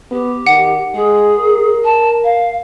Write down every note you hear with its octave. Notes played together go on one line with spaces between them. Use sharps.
B3 G4
D#3 F#5
G#3 G#4
A#4
A5
F5